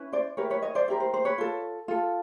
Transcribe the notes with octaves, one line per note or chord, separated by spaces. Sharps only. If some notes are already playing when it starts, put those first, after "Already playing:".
Already playing: C#4 E4 B4
C5 D5
E4 G4 A#4 B4 C#5
B4 C#5
C#5 D#5
C5 D5
E4 G4 A#4 C5
C5
C5
B4 C#5
F4 A4
F4 A4